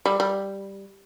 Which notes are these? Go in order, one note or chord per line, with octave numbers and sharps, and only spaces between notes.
G3
G3